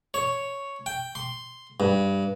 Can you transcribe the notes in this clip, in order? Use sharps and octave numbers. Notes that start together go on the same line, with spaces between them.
C#5
G5
C6
G2